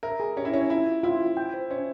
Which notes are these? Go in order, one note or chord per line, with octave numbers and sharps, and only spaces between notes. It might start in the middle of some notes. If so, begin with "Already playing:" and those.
A#4 E5
G#4
C#4 G4
E4
C#4 C#5
E4 F4
F4
E4 F4
F4
G5
C5
C#4 C5